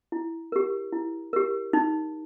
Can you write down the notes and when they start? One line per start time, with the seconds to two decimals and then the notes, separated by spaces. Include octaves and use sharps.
0.12 E4
0.52 G4 A#4
0.93 E4
1.33 G4 A#4
1.73 D#4